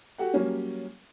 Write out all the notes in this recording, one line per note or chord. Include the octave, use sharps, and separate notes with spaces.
F#4 G4 A4 F#5
F#3 G3 A#3 C#4